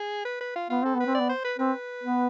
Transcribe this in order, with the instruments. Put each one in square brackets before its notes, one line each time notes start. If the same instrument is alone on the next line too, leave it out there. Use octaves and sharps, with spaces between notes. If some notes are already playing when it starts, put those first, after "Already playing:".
Already playing: [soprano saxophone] G#4
B4
B4
F4
[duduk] B3 [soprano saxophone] F4
[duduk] C4 [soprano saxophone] A4
[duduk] B3
[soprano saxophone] B4
[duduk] C4
[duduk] B3 [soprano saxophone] D5
[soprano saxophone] C5
B4
[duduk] C4 [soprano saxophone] B4
[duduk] B3